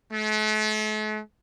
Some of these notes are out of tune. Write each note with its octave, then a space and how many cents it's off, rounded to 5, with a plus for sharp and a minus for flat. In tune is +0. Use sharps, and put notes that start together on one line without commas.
A3 -45